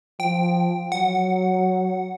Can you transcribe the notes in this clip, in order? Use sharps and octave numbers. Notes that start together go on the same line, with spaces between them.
F3 G5
F#3 F#5